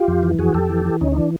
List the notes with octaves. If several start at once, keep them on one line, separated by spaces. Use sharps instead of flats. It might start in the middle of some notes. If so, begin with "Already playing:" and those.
Already playing: F4 G4
F2
E3
F2 F#4 G#4
F2 G4 A4
E3
E3
D2 C#4 D#4
D#4
E3 D4